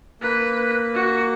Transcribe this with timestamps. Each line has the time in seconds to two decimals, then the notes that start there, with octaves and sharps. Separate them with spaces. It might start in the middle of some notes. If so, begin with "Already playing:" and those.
0.21 A#3 B4
0.94 F#4